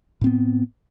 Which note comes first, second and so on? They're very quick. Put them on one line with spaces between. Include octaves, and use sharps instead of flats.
A2 C4 B3